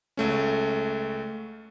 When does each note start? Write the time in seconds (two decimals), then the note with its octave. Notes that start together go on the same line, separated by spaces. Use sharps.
0.17 C#2 A3 C#4